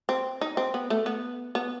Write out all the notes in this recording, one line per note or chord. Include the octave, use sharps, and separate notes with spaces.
C4
D#4
C4
B3
A3
B3
B3